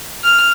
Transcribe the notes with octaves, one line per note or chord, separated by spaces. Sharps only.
F6